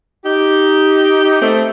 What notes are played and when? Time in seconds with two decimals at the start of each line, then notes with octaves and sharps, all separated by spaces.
0.24 D#4 G4
1.40 A3 C4